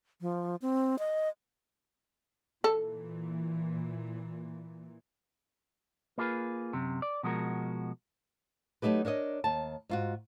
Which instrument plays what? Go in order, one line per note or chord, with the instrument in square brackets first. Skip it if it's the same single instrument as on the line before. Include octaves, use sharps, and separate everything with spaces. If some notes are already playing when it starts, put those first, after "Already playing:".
[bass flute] F3
C4
D#5
[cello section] A#2 E3 [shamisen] A4
[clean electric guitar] A#3 E4 F4 G#4 B4
F#2 C3
D5
B2 F3 G#3 F#4 A#4
[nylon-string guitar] F#3 A3 D#4 G4 B4
D4 A#4 C#5 D#5
D#2 A5
G#2 F4 F#4